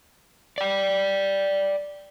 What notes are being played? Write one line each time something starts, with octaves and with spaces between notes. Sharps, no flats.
D5 G5